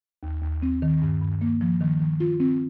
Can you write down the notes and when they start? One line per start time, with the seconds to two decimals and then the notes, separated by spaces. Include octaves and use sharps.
0.23 D#2
0.42 D#2
0.62 C4
0.82 D#3
1.02 G2
1.21 G2
1.41 A#3
1.61 F3
1.81 D#3
2.01 D#3
2.20 F4
2.40 C4